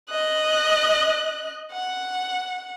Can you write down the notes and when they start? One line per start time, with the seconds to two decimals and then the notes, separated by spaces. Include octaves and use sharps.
0.10 D#5 F#6
1.72 F#5